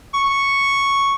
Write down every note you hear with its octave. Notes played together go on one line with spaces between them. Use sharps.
C#6